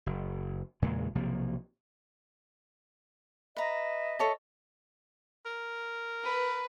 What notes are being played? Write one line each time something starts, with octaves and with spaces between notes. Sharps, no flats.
F#1
E2 A#2 C#3 G#3
B1 C3 F3 A#3
B4 D#5 E5 A#5
A4 C#5 A5
A#4
B4